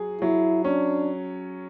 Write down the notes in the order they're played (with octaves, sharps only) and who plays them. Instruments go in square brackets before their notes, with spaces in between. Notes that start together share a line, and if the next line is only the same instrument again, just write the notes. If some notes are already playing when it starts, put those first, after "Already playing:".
Already playing: [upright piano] F#3 G#4
[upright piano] F#3 [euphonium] E4
[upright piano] C#4 [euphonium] D4